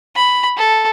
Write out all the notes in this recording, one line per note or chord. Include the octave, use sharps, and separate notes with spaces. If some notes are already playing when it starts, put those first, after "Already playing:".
B5
A4